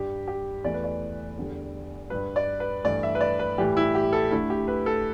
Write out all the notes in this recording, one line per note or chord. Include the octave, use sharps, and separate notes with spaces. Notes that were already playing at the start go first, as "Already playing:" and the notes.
Already playing: G2 G3 G4
G4
E2 E3 A3 D5
B4
D5
E2 D3 G3
G2 G3 B4
D5
B4
G2 E3 A3 D5
E5
B4
D5
B4
A2 E3 G3 G4
E4
G4
A4
D2 D3 A3 E4
G4
B4
A4